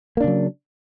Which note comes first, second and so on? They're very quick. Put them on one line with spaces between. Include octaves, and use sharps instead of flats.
A#3 D4 C#3 F#3